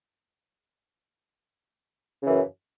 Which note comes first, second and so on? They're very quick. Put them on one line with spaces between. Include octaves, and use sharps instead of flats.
C#3 E3 F#2